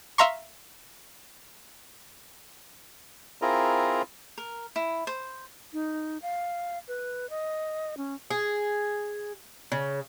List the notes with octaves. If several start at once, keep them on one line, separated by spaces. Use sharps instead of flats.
E5 F5 A#5 C6 C#6
C4 E4 F4 G#4 A#4 A#5
A#4
E4
C5
D#4
F5
B4
D#5
C#4
G#4
C#3